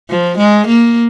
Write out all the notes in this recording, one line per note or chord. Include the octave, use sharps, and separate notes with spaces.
F3
G#3
A#3